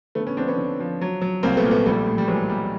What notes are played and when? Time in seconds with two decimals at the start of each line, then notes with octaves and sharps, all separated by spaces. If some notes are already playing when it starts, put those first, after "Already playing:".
0.15 D3 A3 B3
0.26 B3 C#4
0.37 F3 C4 D4
0.47 B3 C#4
0.58 D3
0.80 F3
1.01 F#3
1.21 F#3
1.43 C2 A#3 C4
1.57 A3 B3
1.64 A#2
1.71 A3 B3
1.86 A#1 G3 A3
2.07 A2
2.18 G3
2.28 E3 F#3 G#3
2.49 A#1 G3